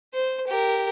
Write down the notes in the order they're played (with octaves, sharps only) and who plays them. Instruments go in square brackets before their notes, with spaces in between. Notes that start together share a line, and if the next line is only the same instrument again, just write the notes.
[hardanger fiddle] C5
G4 A#4